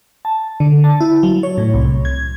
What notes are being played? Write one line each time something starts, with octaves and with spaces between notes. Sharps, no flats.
A5
D3
A5
E4
F#3
C#5
A2
C2
G#6